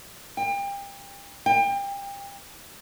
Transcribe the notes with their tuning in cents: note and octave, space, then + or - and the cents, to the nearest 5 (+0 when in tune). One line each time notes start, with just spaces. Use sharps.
G5 +30
G5 +30